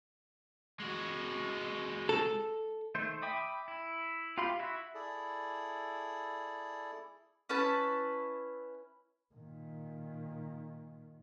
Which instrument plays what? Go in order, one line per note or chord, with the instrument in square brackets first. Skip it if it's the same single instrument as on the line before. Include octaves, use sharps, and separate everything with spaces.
[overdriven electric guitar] G#3 F#4
[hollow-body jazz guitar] A4
[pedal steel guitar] D#3 A3 C5
E5 G5 B5 D6 D#6
E4
F4 G4 F5 B5 C6
E4 F#4 E5
[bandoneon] E4 G#4 A4 D5
[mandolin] C#4 E4 B4 A5
[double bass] A#2 D#3